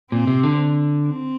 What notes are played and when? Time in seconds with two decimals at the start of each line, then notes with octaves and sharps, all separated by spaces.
0.11 A#2 C4
0.27 C3
0.43 D3
1.06 C4